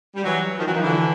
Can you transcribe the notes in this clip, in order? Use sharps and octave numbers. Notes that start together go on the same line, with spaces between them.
G3
E3 F#3
D#3 F3
E3 F#3
D#3 F3
D3 E3